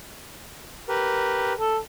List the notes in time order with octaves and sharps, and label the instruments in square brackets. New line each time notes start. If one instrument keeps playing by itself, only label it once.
[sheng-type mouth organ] G4 A#4 B4
[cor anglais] A4